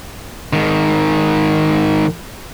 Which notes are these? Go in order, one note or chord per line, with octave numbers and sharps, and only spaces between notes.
G#2 D#3